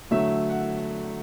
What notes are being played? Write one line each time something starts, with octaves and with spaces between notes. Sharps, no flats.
D3 F#3 A3 E5
F#5